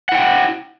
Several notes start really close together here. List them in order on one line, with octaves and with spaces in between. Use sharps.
F#5 E4 G5